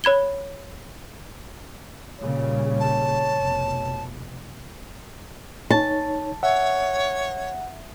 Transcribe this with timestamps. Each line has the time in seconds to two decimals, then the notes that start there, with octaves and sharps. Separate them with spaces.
0.04 C#5 B5 G#6 G7
2.20 A#2 C#3 G3 C#5
2.80 A5
3.33 F1 B2
5.70 D#4 C#5 A5
6.43 C#5 E5 F#5